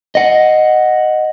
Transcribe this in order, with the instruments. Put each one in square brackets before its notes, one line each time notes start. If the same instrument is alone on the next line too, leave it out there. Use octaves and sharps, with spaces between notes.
[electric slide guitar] D#5 F#5